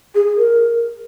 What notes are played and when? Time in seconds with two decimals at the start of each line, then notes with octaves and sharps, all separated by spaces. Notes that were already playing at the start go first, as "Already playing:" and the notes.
0.15 G#4
0.37 A#4